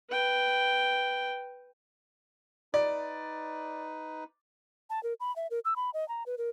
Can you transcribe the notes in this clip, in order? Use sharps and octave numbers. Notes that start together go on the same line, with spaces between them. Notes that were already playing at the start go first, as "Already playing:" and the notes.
B4 G5
D#4 B4 D5
A5
A#4
B5
E5
A#4
E6
B5
D#5
A#5
B4
A#4